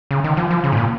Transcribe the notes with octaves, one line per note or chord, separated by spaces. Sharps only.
C#3
D#3
F3
F3
C#3
G#2
A#2